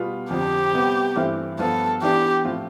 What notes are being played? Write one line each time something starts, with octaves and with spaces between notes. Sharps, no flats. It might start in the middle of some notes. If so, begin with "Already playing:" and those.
Already playing: B2 G3 B3 F4
F2 D3 F3 G4
C3 G3 B3
G2 E3 A3 C4 E4
G2 F3 B3 F4 A4
E3 B3 D4 G4
A2 F3 C4 F4